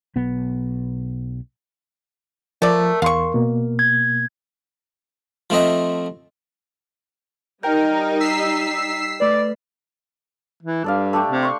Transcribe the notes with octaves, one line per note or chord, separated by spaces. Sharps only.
B1 B3
F3 A3 A#4 D5
E2 F5 C6 C#6
B2 A#3
G#6
F3 A3 C4 D#5 E5
G3 D#4 A#4 G5 G6
E6 B6 C7
A3 B4 D5
E3
G2 A4 D5 F5
A3 D4 G4
C3
C6 C#6